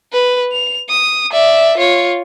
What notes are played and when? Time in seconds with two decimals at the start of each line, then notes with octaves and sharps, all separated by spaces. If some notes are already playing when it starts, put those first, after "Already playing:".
0.12 B4
0.52 F7
0.90 D#6
1.33 D5 E5
1.77 F4 C#5